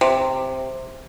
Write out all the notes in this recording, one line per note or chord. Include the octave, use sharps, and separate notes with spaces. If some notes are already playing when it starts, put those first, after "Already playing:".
C3